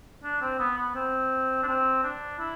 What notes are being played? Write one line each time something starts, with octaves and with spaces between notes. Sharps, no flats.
D4
C4
B3
B3
C4
D4
C4
D4
E4